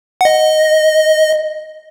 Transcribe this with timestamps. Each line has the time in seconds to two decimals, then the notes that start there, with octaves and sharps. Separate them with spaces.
0.21 F#5
0.25 D#5